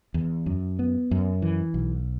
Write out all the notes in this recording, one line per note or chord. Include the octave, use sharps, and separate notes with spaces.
E2
F#2
B3
F#2
E3
B1